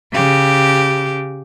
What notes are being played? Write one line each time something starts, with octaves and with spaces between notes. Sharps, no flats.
C#3 G4